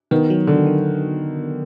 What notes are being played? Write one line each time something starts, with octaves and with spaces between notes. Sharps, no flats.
D#3 B3
F#3
D3 D#3
D#3